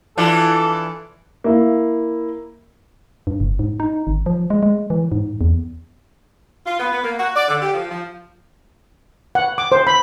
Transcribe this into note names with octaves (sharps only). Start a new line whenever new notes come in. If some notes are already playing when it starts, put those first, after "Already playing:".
E3 D4 F4 A4
A#3 E4
G2
F#1
G#2
D#4
G#1
F3
G#3
G#3
E3
G#2
E2
F4
B3
B3
A#3
F#4
D5
D3
G4
F3
F3
F#5
D6
C5
B5